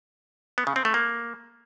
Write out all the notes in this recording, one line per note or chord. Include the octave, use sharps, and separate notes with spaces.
B3
C#3
C4
A3
A#3